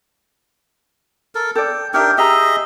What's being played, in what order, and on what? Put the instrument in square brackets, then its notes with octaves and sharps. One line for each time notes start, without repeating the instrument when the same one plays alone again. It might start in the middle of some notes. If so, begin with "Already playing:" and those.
[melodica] A4 A#4
[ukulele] A4 D5 [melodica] G5
[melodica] D4 A#4 G5 [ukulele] D#4 G4 E5
[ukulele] G4 A#5 [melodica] G#4 D#5 E5